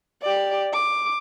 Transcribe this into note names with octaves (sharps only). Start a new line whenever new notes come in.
G4 D5
D6